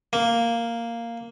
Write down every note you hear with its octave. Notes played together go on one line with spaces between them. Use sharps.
A#3